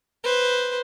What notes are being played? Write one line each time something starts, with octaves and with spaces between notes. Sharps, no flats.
B4 C5